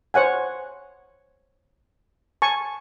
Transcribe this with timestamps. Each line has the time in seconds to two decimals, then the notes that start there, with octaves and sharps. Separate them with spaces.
0.14 C5 C#5 F#5 G#5
2.42 G#5 A5 C#6